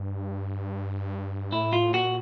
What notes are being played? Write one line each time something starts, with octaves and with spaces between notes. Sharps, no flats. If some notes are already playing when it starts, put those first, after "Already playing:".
Already playing: G2
A2 E4
F4
A#2 F#4